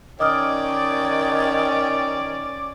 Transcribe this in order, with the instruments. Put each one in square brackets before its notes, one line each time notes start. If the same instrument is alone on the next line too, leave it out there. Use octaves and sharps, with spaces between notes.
[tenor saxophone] D#3 [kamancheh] C#4 D5 [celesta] D#5 D#6 F6 [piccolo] D6